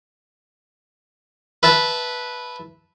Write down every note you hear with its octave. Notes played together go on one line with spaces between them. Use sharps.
B4 E5 A5